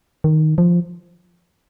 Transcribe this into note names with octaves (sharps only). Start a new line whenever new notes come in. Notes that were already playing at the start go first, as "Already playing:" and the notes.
D#3
F3